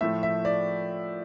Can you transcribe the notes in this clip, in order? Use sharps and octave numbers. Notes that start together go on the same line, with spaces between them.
A2 F3 A3 E5
E5
D5